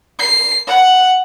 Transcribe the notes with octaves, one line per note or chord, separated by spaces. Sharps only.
C7
F#5